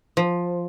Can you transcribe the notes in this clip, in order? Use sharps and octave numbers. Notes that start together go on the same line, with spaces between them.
F3